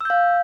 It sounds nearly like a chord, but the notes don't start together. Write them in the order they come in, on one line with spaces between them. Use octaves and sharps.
E6 G6 F5